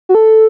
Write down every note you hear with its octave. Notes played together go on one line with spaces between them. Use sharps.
F#4
A4